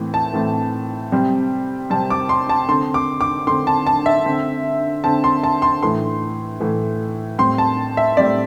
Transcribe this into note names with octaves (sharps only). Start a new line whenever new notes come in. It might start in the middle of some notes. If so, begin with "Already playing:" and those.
Already playing: A2 E3 A3 C4
A5
A2 E3 A3 C4
C3 G3 C4
C3 G3 C4 A5
D6
C6
A5
D3 C4 C6
D6
D6
D3 C4 C6
A5
A5
E5
D3 C4
D3 C4 A5
C6
A5
C6
A2 E3 A3 C6
A2 E3 A3
A2 G3 C4 C6
A5
E5
A2 G3 C4 D5